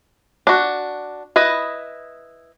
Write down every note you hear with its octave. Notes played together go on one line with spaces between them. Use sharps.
D4 F#4
E4 B4 D#5